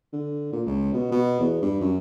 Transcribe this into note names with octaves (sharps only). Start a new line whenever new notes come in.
D3
A#2
C#2
B2
B2
E2
G2
F#2